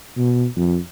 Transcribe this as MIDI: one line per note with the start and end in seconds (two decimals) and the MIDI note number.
0.18 0.45 47
0.56 0.78 41